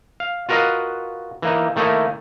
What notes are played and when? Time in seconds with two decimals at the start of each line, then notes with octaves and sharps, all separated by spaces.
0.20 F5
0.49 F4 F#4 A#4 B4 D#5 F5
1.42 E3 A#3 D#4
1.76 D#3 A3 A#3 D#4 E4